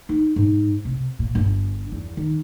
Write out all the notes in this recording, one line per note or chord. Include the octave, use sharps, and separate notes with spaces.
D#4
G#2
C3
A#2
G1
E2
D#3